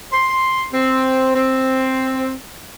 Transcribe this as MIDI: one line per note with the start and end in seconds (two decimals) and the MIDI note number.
0.12 0.66 84
0.72 1.32 60
1.35 2.32 60